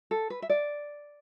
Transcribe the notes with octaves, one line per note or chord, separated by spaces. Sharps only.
A4
B4
E5
D5